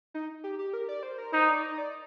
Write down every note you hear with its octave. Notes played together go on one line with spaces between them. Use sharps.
D#4
G4
G4
A#4
D5
C5
A#4
D#4 C5
D5
D#5
D5